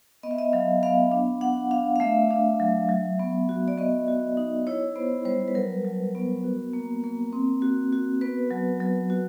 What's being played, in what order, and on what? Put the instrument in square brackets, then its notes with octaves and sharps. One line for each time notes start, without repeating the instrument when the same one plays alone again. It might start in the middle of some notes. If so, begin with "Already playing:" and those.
[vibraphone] B3 D#5
E5
D#5
F#3 F5
B3 F5
D4
D4 F#5
D4 F5
F5
A3 E5
D4
F#3
F#3
B3
F#4
D5
B3 D#5
F#4
D#4
E4 C#5
B3 C5
G3 C5
B4
F#3 A#4
F#3
B3
F#4
A#3
A#3
C4
F#4
F#4
B3 B4
F#3
F#3
F#4